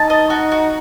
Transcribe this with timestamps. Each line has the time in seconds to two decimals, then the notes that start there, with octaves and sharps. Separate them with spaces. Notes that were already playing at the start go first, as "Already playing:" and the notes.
Already playing: D#4 A5
0.10 D#5
0.30 F#4
0.52 F#4